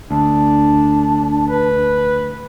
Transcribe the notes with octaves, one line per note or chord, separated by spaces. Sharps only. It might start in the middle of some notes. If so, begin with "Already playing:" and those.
D2 D4
B4